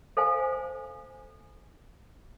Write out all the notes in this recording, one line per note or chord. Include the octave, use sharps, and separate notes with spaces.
A4 C5 F5 G#5